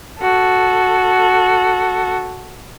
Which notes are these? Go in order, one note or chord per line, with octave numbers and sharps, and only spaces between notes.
F#4 A4